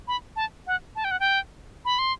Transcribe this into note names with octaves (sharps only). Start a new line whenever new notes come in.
B5
A5
F#5
A5
G5
F#5
G5
B5
C6